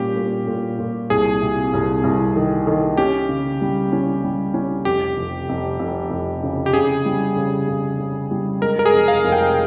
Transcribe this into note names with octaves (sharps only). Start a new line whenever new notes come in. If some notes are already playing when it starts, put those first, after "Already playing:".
Already playing: A#2 G3 C#4 G4
A#2
A#2
A#2
C2 G#4
C3
C2
C2
D#3
D#3
C#4 G4
C#3
G3
C#4
G3
C#4
F1 G4
F1
F1
F1
F1
C#3
G4
C#3 G#4
G3
C#3
C#3
C#3
G3
G#3 A#4
A#4
G#4
F1
F5
F1
G5